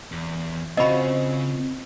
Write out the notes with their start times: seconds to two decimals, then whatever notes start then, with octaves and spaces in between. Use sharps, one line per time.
0.12 E2
0.77 C#3 C4 F4 F#4 G#4 D#5 B5